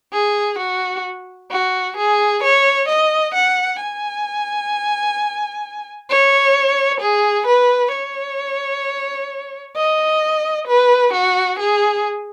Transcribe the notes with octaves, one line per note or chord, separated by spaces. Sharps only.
G#4
F#4
F#4
G#4
C#5
D#5
F#5
G#5
C#5
G#4
B4
C#5
D#5
B4
F#4
G#4